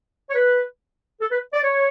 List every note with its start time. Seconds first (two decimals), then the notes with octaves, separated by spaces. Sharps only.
0.30 C#5
0.35 B4
1.21 A4
1.32 B4
1.53 D5
1.64 C#5